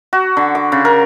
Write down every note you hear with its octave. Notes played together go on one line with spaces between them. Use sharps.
F#4
D3
D6
C#3
A#4